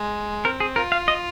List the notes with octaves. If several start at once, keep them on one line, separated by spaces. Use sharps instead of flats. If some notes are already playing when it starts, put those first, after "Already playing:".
Already playing: G#3
C4 A#4
G#4
F4 A#4
F5
D#5